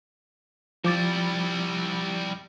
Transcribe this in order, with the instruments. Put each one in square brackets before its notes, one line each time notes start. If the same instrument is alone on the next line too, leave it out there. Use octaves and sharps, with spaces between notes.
[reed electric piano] F3 D6 A6 [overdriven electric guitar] G3 E4